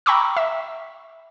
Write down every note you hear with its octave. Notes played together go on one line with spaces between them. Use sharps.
G5 A#5 B5 C#6 D6 E6
E5